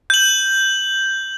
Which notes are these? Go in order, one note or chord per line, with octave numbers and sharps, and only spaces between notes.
G6 F#7